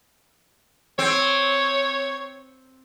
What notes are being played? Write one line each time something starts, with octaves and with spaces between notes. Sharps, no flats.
C4 C#5